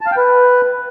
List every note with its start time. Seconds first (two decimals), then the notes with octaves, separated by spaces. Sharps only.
0.01 A5
0.06 F5
0.12 G5
0.17 B4